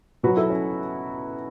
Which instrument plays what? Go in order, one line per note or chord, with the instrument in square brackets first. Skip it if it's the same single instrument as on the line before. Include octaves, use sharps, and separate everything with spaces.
[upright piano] B2 F#3 F#4 B4
E4 A4
C#4